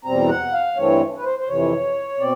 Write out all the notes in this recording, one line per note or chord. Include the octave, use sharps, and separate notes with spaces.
E2 B2 G3 C4 A#5
F#5
F5
G2 E3 A3 C4 C#5
B4
C5
C5
F2 C3 E3 C#5
B2 C4 D5